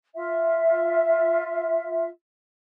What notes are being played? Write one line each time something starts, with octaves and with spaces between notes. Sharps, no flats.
F4 E5